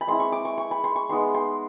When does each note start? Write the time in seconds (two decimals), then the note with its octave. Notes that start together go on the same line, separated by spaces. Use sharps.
0.01 B5
0.07 G#3 C4 E4 C6
0.20 C#6
0.32 D6
0.45 C#6
0.58 C#6
0.71 B5
0.84 C6
0.96 C#6
1.09 G#3 B3 D#4 C6
1.34 C6